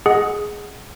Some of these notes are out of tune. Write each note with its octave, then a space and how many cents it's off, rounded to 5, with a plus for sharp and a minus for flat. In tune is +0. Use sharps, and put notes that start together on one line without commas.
G#4 +0 D#5 +0 F#5 +0